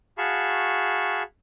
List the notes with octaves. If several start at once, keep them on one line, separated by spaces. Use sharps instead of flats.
F#4 G#4 F5 A5 B5 C#6